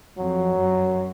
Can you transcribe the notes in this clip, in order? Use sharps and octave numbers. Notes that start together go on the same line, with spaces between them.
F2 F#3
F#2